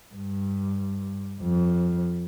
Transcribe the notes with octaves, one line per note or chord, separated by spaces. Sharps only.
G2
F2